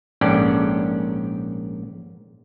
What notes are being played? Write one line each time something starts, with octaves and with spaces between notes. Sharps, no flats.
A#1 G#2 C#4 A4 D5 G5